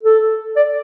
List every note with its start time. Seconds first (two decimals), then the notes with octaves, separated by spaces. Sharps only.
0.03 A4
0.56 D5